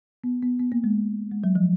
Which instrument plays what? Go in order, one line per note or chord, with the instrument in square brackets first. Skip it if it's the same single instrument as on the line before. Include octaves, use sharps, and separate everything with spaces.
[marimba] B3
B3
B3
A#3
G#3
G#3
F#3
F3